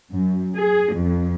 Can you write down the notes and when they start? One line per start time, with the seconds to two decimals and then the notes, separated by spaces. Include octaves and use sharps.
0.13 F#2
0.56 G#4
0.94 F2